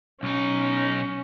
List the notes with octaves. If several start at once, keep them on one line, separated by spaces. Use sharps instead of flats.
B1 C#4 D#4